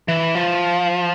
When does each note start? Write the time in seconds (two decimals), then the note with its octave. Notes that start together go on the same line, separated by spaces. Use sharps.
0.08 E3
0.35 F3